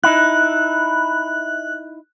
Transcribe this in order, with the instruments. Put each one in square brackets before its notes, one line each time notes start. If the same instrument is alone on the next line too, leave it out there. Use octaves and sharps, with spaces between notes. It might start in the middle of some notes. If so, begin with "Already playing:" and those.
[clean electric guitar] D#4 E4 [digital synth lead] F#6